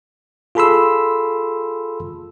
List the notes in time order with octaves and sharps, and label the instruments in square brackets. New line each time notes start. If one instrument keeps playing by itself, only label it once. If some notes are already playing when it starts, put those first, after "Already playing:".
[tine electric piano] F4 G#4 A4 B5 C6 E6